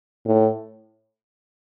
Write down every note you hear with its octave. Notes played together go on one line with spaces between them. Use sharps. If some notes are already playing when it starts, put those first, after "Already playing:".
A2